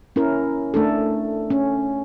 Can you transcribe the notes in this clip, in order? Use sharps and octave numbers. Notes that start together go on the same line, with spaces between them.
C#4 E4 A#4
A3 D4 A4
C#4